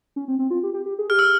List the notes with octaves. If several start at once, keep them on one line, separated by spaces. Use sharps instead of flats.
C#4
C4
C4
F4
G4
G4
G4
G#4
G4 F6
E6